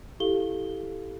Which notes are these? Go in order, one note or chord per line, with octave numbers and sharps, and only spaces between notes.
E4 G4 A4 F5 G7